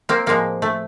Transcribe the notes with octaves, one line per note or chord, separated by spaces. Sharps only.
A#3 C4
A2 F3 G#3 A#3
A3